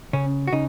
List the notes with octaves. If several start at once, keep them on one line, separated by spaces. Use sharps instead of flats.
C#3 C#4
F#4
C#3 D#4